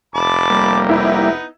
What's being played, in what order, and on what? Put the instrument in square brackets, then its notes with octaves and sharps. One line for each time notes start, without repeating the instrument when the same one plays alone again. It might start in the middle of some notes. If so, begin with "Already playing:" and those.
[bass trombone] F1 [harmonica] A5 B5 D6
[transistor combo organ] G3 A#3
[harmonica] B3 D#4 [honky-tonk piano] E4